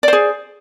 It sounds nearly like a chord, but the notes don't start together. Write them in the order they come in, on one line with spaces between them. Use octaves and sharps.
D5 C5 G#4